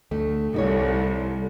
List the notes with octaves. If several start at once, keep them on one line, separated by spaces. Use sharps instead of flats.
D2 A3
C2 D#4 A4 C#5